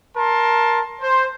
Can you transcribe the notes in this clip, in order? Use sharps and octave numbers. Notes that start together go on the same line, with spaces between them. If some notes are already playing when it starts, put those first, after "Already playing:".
A#4 A5 C6
C5